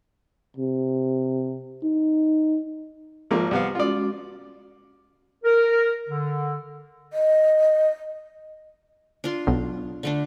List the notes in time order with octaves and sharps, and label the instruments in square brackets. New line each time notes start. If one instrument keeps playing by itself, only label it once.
[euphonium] C3
D#4
[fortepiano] G#1 F3 A#3
C2 B3 F5
[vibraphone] G#3 C#4 F#4 [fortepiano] F4 D5
[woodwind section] A#4
D3
[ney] D#5
[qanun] D4 F4 C6
[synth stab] B1
[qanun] D3 A3 D4